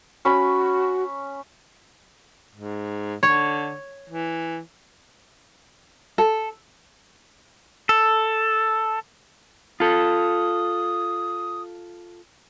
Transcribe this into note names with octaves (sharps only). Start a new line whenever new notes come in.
C#4 F#4 B5
G#2
D3 C#5
E3
A4
A4
F4 A4 D#6